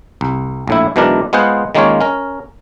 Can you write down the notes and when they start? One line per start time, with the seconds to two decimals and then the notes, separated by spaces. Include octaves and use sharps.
0.21 C2
0.68 A#1 A2 E4
0.96 B1 B2 E3 G#3 D4 A#4
1.33 G#3 B3 F4 G#4 C5 F#5
1.75 D#3 G#3 A#3 C#4 F4 C#5
2.01 C#4 A#4